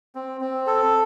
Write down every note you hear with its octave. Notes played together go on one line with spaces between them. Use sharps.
C4
C4
A4